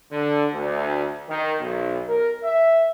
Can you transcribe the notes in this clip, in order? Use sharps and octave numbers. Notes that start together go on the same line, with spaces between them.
D3
D2
D#3
B1
A#4
E5